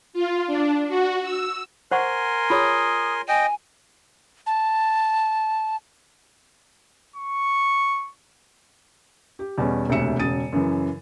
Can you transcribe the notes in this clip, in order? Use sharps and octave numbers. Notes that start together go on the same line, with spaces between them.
F4
D4
F#4
E6
A#4 C5 F#5 G#5 C6 C#6
F4 G#4 C#5 D#6
D#5 G5 G#5
A5
C#6
G4
E2 B2 G3 C#4
E1 D2 C3 E5 C#7 E7
E1 C#3 D#6 A6 D#7
F#2 C#3 E3